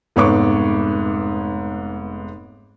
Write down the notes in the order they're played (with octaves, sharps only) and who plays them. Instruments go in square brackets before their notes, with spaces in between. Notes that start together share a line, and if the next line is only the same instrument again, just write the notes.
[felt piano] F1 G#2 B3 C#5 C#6 D6